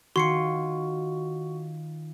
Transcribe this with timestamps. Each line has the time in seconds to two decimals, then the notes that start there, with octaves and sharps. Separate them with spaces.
0.16 D#3 F4 F#4 C6 C7 C#7